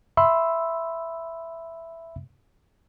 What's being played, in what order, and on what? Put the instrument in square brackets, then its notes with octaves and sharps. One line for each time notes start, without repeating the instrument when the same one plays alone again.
[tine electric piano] E5 B5 C6 E6